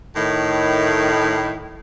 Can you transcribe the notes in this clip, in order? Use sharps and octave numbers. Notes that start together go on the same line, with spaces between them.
A2 D#3